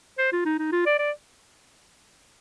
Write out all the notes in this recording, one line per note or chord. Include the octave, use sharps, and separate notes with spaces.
C5
F4
D#4
D#4
F4
D5
D5